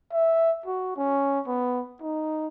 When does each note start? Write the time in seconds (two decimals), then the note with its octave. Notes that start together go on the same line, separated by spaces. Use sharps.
0.12 E5
0.66 F#4
0.97 C#4
1.47 B3
2.01 D#4